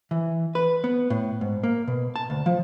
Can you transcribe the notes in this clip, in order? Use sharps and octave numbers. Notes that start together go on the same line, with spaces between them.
E3
B4
B3
A2
G#2
A#3
B2
A5
D2
F3